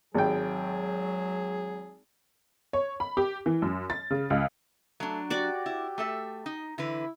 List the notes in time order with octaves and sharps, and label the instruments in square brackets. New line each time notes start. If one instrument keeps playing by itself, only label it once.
[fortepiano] G#1 G5 [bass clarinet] F#3 [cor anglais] G#4
[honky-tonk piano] C#5
B5
G4
E3
F#2
A6
C#3
C#2
[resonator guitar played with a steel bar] F#3 D4 [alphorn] A3
[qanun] F#4 D5 [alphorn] G4
[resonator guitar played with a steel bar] E4
A3 A4 E5
D#4
[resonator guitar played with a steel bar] D3 E3 B4 [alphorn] E4